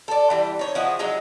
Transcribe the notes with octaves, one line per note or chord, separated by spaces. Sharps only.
A4 D5
E3 G3
D#4 C#5
F3 E4 F#4 G#4
F#3 G#3 D#4